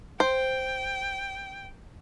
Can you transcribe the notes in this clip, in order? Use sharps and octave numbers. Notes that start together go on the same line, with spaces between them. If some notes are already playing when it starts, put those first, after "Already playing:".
C5 G5